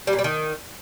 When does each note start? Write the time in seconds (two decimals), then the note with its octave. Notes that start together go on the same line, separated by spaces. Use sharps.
0.07 G3
0.13 A#2
0.19 G3
0.24 D#3